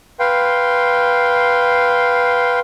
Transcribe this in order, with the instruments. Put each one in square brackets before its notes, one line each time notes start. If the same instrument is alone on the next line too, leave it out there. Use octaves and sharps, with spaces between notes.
[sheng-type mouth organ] B4 F5 G5 C6